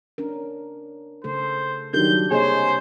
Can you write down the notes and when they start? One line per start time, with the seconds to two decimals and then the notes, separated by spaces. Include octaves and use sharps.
0.18 C#4 D4 A#4
1.24 C#3 A3 A4 C5
1.93 D#3 F#3 G3 D4 G4 G6
2.31 C3 A#3 G#4 C5 C#5 D#5